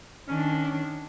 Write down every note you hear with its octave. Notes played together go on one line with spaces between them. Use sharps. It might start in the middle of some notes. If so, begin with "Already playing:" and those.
D#3 C#4 D4